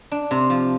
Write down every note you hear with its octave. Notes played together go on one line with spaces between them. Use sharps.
D4
C3
F3